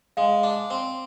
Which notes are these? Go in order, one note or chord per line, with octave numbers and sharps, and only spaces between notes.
G#3 F5
D4
C4